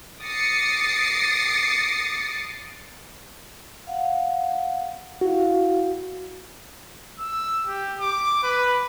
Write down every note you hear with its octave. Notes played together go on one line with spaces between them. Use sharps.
D6 D#6 A6 A#6 C7 C#7
F5 F#5
E4 F#4 F5
E6
G4
D6
B4